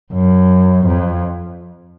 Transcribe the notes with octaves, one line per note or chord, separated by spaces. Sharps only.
F#2
F2